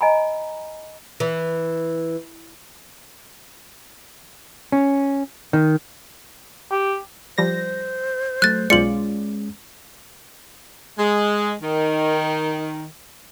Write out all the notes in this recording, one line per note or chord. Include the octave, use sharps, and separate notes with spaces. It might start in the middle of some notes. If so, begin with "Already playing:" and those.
D#5 G#5 A#5 B5
E3
C#4
D#3
G4
F3 G3 C5 A#6
F#3 A3 F#6 A6
B1 G#3 C#4 F4 D5 C#7 F#7
G#3
D#3